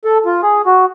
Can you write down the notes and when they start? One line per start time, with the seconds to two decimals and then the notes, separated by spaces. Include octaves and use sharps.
0.05 A4
0.25 F4
0.43 G#4
0.66 F#4